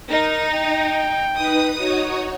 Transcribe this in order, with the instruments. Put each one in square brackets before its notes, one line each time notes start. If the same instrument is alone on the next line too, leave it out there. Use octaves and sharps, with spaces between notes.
[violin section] D#4 [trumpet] A#4
[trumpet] G5
[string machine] D#4 B4 [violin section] D#6
[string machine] D#4 F#4 C#5